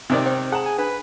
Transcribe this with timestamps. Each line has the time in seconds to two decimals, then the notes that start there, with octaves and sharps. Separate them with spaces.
0.10 C3 D#3 D#4 C5 D5
0.26 C5 G5
0.52 G#4 F#5 A5 A#5
0.66 G#5
0.78 D4 B4